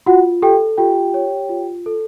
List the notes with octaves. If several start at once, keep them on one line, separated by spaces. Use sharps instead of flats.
F4 F#4 F#5
G4 A4 G5
F4 G4 G5
C#5
F4
A4